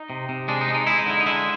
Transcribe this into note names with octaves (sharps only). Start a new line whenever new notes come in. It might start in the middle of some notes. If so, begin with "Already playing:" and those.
Already playing: D#4
C3
C3
G#3 D4
D#4
G#3
D#4
G#3 E4
D#4
D3 E4
D#4
G#3 E4